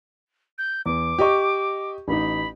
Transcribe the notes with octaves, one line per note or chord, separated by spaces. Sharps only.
G6
E2 D6
G4 D#5 C#6
A1 D#4 B5